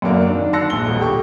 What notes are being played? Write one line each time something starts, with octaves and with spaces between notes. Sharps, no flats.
F#2 D3 F#3 A#3 D4
D#3 D4
A5 C6 E6 F#6 A#6 C#7
A#1 G7
D#1 G2 B2
G4 A4 C#6